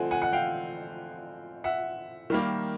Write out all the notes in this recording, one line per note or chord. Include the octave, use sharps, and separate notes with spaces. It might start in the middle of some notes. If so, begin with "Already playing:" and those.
Already playing: D3 F3 A3 C4 F#5 G#5
F#5 G#5
F#5
F5 G5
E5 F#5
D#3 G3 A#3